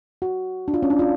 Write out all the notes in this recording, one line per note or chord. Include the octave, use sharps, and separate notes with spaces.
F#4
D4
F4
C#4
D4
F4